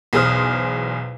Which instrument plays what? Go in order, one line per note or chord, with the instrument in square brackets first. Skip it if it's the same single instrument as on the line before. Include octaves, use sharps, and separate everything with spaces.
[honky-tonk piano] B1 E2 G#4 C5 D#6 F6